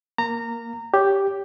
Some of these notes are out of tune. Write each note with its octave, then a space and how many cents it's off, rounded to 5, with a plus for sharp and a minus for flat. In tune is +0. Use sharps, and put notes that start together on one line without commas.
A#3 +0 A#5 -20
G4 +0 C#5 +20